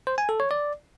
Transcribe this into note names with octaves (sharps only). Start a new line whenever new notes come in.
C5
G#5
A4
C#5
D5